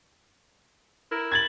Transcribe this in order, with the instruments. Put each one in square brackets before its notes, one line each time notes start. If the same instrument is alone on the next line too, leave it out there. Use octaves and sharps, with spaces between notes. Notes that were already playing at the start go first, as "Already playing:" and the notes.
[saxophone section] E4 A#4
[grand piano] G#6 A6 F#7